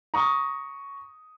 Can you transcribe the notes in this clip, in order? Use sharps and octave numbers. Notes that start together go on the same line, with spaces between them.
A#5 C#6 D#6